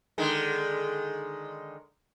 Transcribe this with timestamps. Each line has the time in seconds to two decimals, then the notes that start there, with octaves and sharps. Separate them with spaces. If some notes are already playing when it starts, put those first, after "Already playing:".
0.18 D3 D#3 G#3